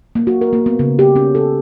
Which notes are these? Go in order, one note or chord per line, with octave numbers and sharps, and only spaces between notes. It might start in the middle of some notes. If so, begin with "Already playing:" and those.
A#3
F#4
A#4
A#3
B3
C#3
G4
C#4
A4